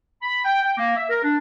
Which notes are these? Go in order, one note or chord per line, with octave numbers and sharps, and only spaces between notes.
B5
G5
G5
A#3
E5
A#4
D4